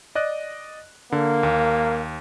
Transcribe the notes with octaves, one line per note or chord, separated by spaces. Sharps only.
D5 D#5 F#6
D3 A#3
D#2